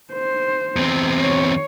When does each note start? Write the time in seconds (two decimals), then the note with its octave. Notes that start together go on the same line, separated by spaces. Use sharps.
0.13 C5
0.76 E2 C4
1.21 C#5